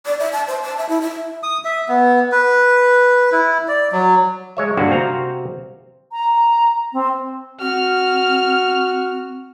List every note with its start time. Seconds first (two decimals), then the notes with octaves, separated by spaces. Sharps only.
0.06 D5
0.19 E5
0.32 A5
0.47 C5
0.62 A5
0.78 E5
0.89 E4
1.02 E5
1.43 D#6
1.65 E5
1.89 B3
2.32 B4
3.32 E4
3.68 D5
3.92 F#3
4.57 G#3 C#5 E5
4.77 G2 D3 A#3 F#4 G4
4.90 C3 C4 F#4 F5 A#5
6.12 A#5
6.93 C4
7.61 C4 F#4 F6